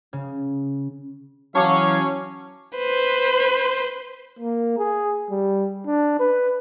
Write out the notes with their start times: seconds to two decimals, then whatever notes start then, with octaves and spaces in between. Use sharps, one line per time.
0.13 C#3
1.55 E3 F#3 C#4 C#5 F5 A5 C#6 D6
2.76 B4 C5
4.39 A#3
4.78 G#4
5.30 G3
5.86 D4
6.20 B4